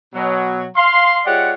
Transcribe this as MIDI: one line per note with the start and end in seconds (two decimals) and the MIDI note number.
0.13 0.64 47
0.13 0.64 54
0.76 1.19 77
0.76 1.19 84
1.26 1.53 56
1.26 1.53 65
1.26 1.53 67
1.26 1.53 73
1.26 1.53 74
1.26 1.53 78